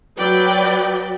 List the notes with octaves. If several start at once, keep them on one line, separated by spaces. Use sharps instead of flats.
F#3 B4 D5 G5